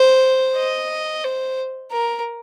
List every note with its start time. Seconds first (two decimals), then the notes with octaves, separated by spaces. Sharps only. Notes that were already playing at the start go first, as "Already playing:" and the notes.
Already playing: C5
0.57 D#5
1.24 C5
1.91 A#4